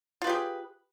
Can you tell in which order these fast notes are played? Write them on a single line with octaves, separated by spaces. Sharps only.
F4 B4 G4 G#4